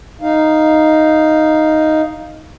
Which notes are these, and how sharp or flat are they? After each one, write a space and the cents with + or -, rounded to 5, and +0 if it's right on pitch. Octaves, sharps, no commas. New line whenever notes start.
D#4 +0 F5 +0